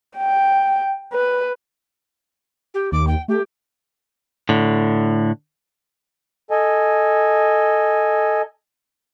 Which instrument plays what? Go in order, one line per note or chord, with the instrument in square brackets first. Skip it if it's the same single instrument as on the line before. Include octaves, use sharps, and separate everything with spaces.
[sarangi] G5
B4
[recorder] G4
[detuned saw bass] D#2 [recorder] D6
[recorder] G5
[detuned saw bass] A3 [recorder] G4
[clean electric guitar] A2 D3
[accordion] A4 D#5 G#5